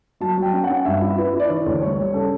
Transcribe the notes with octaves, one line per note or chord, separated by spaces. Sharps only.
F#3 A5
F#3 G5
C#4
F#5
C#4
G2 E5
E4
E4 B4
E4
D5
E3 C#5
D2
G3 C#5
G3
C#3 A4